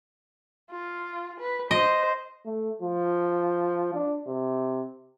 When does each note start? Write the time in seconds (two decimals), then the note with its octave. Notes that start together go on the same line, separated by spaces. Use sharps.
0.71 F4
1.40 B4
1.71 C5 D#5
2.45 A3
2.82 F3
3.94 D4
4.27 C3